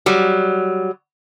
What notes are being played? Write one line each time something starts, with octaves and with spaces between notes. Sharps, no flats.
F#3 G3